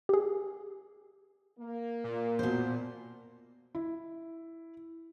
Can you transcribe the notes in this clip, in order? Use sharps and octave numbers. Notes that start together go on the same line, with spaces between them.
G4 G#4
A#3
A#2
B2 C5
E4